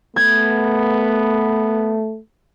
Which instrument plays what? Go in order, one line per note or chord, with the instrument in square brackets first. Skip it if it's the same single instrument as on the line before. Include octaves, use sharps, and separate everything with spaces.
[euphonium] A3 [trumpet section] B3 [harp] G#6